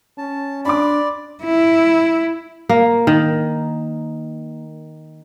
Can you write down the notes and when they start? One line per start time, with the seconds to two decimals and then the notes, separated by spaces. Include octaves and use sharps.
0.18 C#4 A5
0.65 D4 D5 B5 C6 D6
1.44 E4
2.69 A#3
3.07 D#3